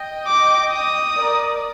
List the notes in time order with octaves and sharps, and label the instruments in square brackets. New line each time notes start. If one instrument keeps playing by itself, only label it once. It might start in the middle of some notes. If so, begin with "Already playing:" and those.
Already playing: [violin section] D#5 G5
[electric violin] D6
D#6
[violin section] A#4 D5